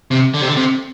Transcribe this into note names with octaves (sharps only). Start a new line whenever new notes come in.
C3
D3
C3
D3
C3